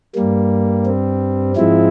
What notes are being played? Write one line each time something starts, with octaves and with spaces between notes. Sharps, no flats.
G2 G3 A#3
C4
G#2 F3 G#3 C4 E4